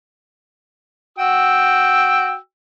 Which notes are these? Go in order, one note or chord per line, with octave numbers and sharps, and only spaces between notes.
F#4 G5 E6